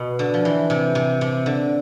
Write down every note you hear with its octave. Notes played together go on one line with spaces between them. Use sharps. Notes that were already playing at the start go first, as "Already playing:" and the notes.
Already playing: B2
D3
F3
E3
C3
C3
C3
D3